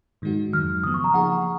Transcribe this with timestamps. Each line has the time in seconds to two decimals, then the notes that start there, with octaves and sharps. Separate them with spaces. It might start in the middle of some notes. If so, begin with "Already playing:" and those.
0.22 G#2 D#3 G#3 D#4 F#4
0.53 F2 D#3 F#3 F6
0.83 C#3 F3 B3 D#6
0.94 C#6
1.04 A#5
1.14 F3 A#3 D#4 G#4 F#5